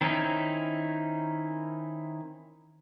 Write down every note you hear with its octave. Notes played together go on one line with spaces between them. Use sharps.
D#3 C4 C#4 D#4 E4